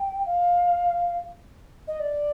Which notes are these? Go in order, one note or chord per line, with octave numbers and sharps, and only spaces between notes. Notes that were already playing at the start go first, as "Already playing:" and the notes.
Already playing: G5
F5
D#5
D5